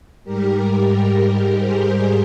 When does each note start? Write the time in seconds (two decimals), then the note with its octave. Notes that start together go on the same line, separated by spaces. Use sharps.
0.24 G#2 G3 G4 A#4
1.13 G4 A#4
1.59 G#4 C5